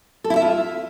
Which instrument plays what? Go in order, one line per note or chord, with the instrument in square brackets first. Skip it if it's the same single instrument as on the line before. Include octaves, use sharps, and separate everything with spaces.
[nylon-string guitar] A4
E4
E5
F4